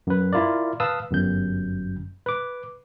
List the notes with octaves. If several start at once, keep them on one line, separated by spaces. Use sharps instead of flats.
F#2 B4
E4 F4 A#4 D5
B4 F5 A5 D#6 E6
G1 F#2 G6
B4 D6